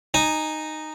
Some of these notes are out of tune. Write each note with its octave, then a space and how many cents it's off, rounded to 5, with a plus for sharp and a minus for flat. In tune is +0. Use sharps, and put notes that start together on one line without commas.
D#4 -10 G#5 +0